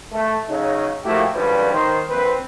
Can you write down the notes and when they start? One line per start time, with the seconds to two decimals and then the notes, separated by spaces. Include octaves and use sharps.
0.12 A3
0.48 C#3 F#3 D#4
1.04 F3 A3 A#3 E4 F#4 G4
1.33 G#1 D3 F3 G3 C#4 B4
1.72 D#3 C5
2.10 A#1 C4 B4